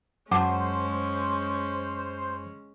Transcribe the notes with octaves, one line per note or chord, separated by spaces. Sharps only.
F#2 G#3 C#4 C5 F#5 A5 D6